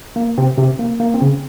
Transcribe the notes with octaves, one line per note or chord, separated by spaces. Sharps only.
A#3
C3 C4
C3 C4
A#3
A#3
C4
C#3 C#4